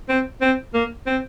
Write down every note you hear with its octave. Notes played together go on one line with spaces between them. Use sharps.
C4
C4
A#3
C4